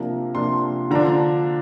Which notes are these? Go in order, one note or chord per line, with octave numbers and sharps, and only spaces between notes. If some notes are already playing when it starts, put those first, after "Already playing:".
Already playing: C3 F3 A#3 D4
C3 F3 A#3 D4 C6
D3 F3 D4 A#5